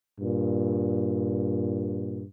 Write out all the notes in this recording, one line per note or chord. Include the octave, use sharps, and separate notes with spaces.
G2 A#2